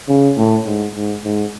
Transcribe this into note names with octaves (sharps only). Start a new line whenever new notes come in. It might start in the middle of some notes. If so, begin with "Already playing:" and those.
C#3
A2
G#2
G#2
G#2